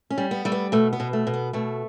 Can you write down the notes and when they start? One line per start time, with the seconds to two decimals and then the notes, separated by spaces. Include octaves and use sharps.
0.10 C#4
0.18 G3
0.31 B3
0.45 G3 A3
0.52 B3
0.72 B2 A3
0.93 B3
1.00 B2
1.13 A3
1.27 B2
1.33 B3
1.53 B2 A3